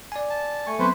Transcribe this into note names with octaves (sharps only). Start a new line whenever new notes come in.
D5 G#5
A5
A3 G#5 C#6
F#3 B3 C4 B4 C5